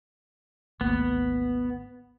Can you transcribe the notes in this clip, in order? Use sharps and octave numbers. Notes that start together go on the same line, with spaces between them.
G#1 D2 A#3 B3